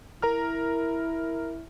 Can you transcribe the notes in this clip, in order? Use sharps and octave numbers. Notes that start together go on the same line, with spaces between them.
E4 A#4 A#5 F6